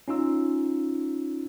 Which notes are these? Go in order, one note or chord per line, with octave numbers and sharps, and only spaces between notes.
C#4 D#4 F4 E6